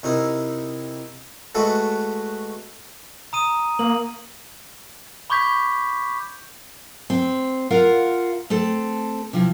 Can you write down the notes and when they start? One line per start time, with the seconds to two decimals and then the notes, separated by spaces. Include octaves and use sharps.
0.03 C3 D#4 E4 A#4
1.55 G#3 A3 F#4 A4 B4
3.33 A#5 D#6 D#7
3.79 A#3 F#7
5.30 B5 C#6 D6 G6 G#6 B6
7.10 C4
7.71 F4 A#4 F5 F#5
8.50 A3 C4 A4
9.33 C3 F3 E4